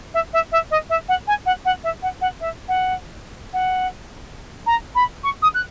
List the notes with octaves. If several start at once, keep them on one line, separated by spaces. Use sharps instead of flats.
E5
E5
E5
D#5
E5
F#5
G#5
F#5
F#5
E5
F#5
F#5
E5
F#5
F#5
A#5
B5
C#6
D#6
F#6